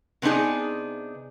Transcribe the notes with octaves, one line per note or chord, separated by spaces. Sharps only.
C3 B3 D4 D#4 G#4